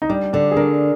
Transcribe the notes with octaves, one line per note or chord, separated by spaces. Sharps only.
D#4
G3 D4
D3 D4
G#4
D4 A#4